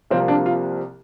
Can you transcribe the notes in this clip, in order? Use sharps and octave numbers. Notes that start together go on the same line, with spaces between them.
C2 C3 F3 A#3 C4
D4
F4